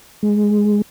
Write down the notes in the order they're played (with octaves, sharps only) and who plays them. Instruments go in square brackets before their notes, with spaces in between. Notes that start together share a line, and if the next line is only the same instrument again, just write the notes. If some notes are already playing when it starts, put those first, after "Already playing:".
[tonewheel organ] G#3